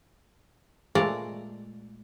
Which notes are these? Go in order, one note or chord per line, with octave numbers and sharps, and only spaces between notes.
A#2 G#3 A3 D5 A#5